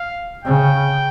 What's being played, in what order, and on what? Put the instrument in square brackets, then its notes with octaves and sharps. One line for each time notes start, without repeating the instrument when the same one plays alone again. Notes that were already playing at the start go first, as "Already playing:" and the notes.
Already playing: [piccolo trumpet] F5
[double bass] C#3 [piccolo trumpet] G5